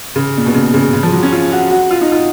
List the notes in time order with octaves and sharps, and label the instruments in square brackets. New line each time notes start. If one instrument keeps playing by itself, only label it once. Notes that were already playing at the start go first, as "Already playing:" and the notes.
[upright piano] C#3
A#2
B2
C#3
C#3
C#3
F3
F#3
C#4
F4
F#4
F#4
F4
D#4
F4